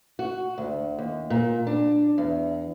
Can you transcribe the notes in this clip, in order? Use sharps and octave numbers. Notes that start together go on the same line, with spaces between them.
F#4
D2
D#2
A#2
D4
E2